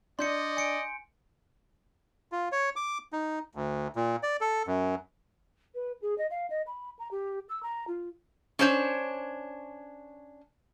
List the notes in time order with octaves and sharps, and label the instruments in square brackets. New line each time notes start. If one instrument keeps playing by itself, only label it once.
[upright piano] D4 [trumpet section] D5 D#5 [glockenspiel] C6 G6 C#7
[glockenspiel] G#5 C#7 D7
[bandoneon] F4
C#5
D6
D#4
D2
A#2
D5
A4
F#2
[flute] B4
G#4
D#5
F5
D#5
B5
A#5
G4
E6
A#5
F4
[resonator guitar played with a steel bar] C#4 D4 C5 C#5